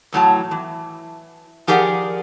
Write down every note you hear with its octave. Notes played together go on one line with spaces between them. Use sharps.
E2 A2 F#3 A5
E3
F3 G4 G#4 A#4 D5 F#5